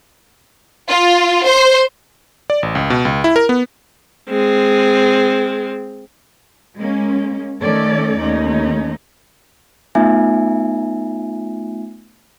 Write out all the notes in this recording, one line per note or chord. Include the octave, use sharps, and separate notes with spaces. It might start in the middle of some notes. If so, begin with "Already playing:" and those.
F4
C5
D5
A1
C#2
B2
C#2
E4
A#4
B3
G#3 C4
G#3 A#3 C#4
D#3 A3 C#4 A4 D5
D#2 A3 C#4 D#4
A3 B3 D#4 F4 E5 G#5